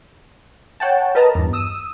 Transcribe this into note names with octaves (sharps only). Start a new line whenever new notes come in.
C#5 F#5 G5 A5
A#4 B4 D#5 A5 A#5
E2 G2
D#6 E6